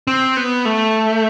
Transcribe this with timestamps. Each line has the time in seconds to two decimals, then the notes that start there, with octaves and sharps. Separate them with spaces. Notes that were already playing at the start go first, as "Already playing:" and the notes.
0.07 C4
0.37 B3
0.65 A3